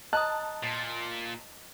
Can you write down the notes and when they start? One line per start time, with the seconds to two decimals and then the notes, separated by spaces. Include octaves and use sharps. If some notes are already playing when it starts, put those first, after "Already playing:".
0.13 D#5 A5 A#5 D#6 F#6
0.63 A#2